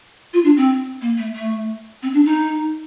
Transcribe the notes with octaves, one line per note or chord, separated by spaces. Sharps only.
F4
D4
C4
A#3
A3
A3
C4
D4
D#4